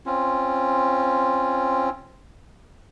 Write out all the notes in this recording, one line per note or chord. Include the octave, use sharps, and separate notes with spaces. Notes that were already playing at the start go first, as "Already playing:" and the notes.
C4 C#4 F4